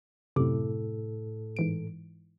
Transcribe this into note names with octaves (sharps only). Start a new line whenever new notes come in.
F#2 A2 C3 A4 D6
G#2 E3 D7